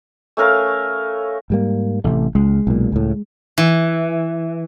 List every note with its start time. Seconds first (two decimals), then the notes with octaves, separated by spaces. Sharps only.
0.37 A3 C#4 A#4 F5
1.50 G#2 G3 A#3
2.04 A1 C3 A3
2.35 C#2 G#3
2.67 B1 A#2
2.92 C#2 A2
3.58 E3